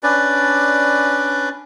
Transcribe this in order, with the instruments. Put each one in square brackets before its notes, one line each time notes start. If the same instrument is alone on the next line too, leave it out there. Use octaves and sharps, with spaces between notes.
[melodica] C#4 D4 B4 D5